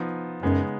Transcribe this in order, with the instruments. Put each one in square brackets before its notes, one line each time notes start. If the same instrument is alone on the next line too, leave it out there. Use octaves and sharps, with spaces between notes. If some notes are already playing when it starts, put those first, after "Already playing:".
Already playing: [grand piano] F3 B3 D#4
[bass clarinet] F#2 [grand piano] C#3 G#3 B3 D#4